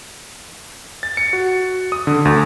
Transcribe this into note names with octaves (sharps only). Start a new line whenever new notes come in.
A6
C#7
F#4
D#6
D3
D2